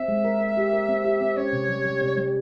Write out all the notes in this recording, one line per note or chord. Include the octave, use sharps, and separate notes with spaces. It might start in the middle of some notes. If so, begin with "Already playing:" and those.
Already playing: C4 E5
G#3
A#4
A#4
G4
A#4
C4
G4
C4
C#4 C#5
C3
G3
G3
C3
G3